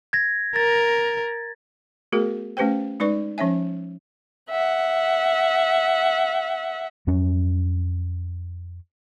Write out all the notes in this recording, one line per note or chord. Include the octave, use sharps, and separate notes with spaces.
G#6 A#6
A#4 A6
A3 B3 F#4 G#4 A#4
A3 C#4 G4 B4 C5 G5
G#3 D#4 B4 D5 C#6
F3 C#4 C#5 E5 G#5
E5 F#5
F2 F#3 C#4